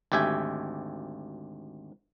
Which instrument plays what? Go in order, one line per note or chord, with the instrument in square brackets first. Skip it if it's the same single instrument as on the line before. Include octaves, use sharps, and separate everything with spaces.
[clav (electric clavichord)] G#1 D2 G4 E5 G#5